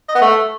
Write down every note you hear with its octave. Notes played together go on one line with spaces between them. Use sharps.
D#5
B3
A3